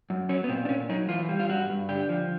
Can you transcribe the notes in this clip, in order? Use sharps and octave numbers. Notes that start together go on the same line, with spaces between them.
F#2
F#3 C#4
B3
A#2 C4
D4
A#2 C#4
F#3 D#4
E3 F4
G3
F4
G2 F#4
G2
D3 G4
F3